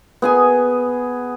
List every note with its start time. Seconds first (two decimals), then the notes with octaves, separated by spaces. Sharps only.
0.22 B3 G#4 G#5